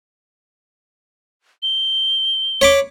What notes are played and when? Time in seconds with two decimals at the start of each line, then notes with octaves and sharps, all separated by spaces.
1.63 G7
2.61 C#5 B5 D6